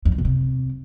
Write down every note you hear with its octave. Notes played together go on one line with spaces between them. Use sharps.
F2
G#2
B2
C3